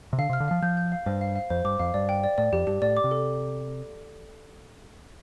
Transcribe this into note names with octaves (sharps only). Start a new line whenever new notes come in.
C3
D3 F5
C3
F6
D3
F3 F5
F3 G6
G6
F5
G2 C5
F5
F5
F2 C5
G2 D6
F2 F5
G2 D5
G5
D5
A2 D5
F2 G4
G2 G4
A2 D5
D6
C3
A4